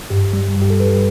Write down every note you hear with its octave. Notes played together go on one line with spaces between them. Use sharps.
G2 G4
G3
G2
G4
A4
G3 B4